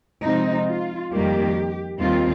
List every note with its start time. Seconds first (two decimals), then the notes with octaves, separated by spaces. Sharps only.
0.24 C3 F3 G#3 C4 D#4
0.68 F4
1.11 F2 D#3 G3 A#3 G4
2.00 D#2 D#3 G3 C4 F4